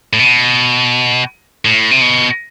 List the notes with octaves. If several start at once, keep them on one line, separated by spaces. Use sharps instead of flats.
A2
B2
A2
C3
B2